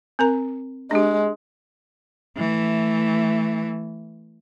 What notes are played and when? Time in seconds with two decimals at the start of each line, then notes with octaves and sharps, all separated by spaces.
0.19 C4 A#4 A#5
0.91 G#3 D4 G4
2.38 E3 A3